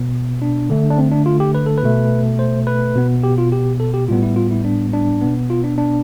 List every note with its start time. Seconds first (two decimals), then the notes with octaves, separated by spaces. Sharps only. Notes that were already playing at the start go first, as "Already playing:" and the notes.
Already playing: B2 B3
0.42 D4
0.70 D3 A3
0.90 D4
0.98 C4
1.12 D4
1.26 F4
1.40 G4
1.55 B4
1.66 A4
1.78 B4
1.83 B2 A3
2.39 C5
2.67 B4
2.95 B2 B3
3.24 G4
3.38 F4
3.52 G4
3.80 A4
3.94 G4
4.08 A2 G3 B3 F4
4.23 E4
4.36 F4
4.51 E4
4.65 D4
4.93 D4
5.22 B2 B3
5.50 F4
5.64 D4
5.78 D4